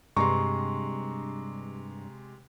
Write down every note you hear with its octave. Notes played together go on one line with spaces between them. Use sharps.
G2 C3 G#3 A#5 C6 C#6